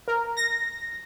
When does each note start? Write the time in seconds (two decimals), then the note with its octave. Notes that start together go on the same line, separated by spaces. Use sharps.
0.08 A#4
0.37 A#6